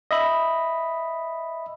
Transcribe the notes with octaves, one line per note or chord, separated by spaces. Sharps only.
D#5 E5 B5